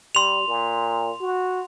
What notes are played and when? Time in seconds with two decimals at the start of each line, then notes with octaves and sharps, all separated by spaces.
0.15 G3 C6 F7
0.48 A#2
1.21 F#4